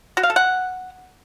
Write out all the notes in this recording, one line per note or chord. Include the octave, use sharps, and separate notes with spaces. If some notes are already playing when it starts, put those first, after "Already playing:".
F#4
F5
A4
F#5